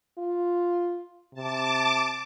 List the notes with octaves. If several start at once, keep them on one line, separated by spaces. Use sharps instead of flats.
F4
C3 A5 D6